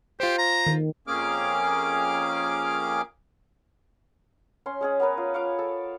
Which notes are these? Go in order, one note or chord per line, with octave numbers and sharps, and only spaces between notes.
F4 G4 C5
A#5
D#3
F2 A#3 C#4 G#4 D6 F6
C#4 C6
G#3 C#4 G#4
B3 C#4 A#4 B4
F4
C#5 F5 D6
A4